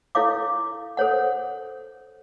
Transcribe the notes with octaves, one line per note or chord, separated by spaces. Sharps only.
E4 A4 C#5 F5 D6
A4 C5 C#5 F#5